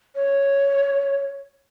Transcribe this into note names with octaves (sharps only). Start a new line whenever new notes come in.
C#5